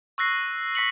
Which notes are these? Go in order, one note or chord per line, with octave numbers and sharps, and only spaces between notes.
C#6 E6 F#6 A#6 C7
C#6 B6 C#7 F#7